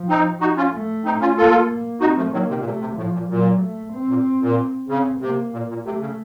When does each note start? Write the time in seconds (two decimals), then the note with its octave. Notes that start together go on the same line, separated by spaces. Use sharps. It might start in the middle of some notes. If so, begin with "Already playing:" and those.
Already playing: F3
0.09 C4 D#4
0.41 D#4 F#4
0.57 C#4 F4
0.73 A3
1.05 C4 D#4
1.21 C#4 F4
1.37 A#3 F4 A4
2.01 C4 D#4 F#4
2.16 F3 A3
2.32 D#3 F#3 A#3
2.49 C3 D#3
2.59 A#2
2.65 C3 A3
2.80 C3
2.97 A2 F3
3.13 A#2
3.29 A#2 F#3
3.61 A3
3.93 C4
4.09 A#2
4.41 A#2
4.88 C#3 C4
5.21 C3 A#3
5.53 A#2
5.69 A#2
5.85 C3 A3
6.00 C#3